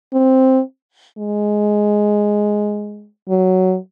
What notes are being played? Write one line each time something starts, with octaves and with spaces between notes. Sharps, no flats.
C4
G#3
F#3